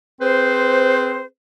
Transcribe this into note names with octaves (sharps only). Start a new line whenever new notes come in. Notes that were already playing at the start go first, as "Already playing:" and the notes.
C4 G#4 B4 C5